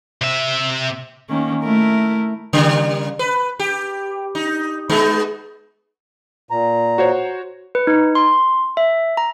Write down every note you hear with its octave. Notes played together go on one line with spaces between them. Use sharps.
C3 E5
D#3 A#3 C#4
A3 E4 A#4
C#3 G3 A#3
B4
G4
D#4
G#3 B3 D#4
A#2 A#5
F#4 C5 C#5
B4
D#4
C6
E5
A#5